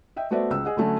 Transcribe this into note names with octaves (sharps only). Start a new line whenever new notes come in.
D#5 E5 G5
A3 B3 F#4 C5 D5 E5
C#2 E6
G#4 D#5 F#5
D3 F#3 A3 C#4 F#4